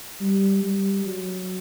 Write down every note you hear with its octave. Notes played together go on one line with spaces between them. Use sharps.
G3
G3
F#3